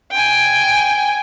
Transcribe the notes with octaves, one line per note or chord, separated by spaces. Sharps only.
G5 G#5